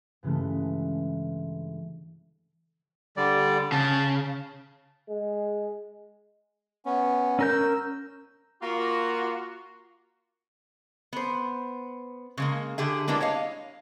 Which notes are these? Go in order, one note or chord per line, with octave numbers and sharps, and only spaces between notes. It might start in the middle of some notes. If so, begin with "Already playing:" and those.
G2 C#3 E3 G#3 A3
D3 G3 D5
C#3 A5
G#3
B3 C#4
C#4 A#4 E6 G6
A#3 F4 F#4
B3 C5
C#3 G#3 A#3
D3 G4 G#4 E5
G#3 A#3 B3 D4 E4
C#5 D#5 F5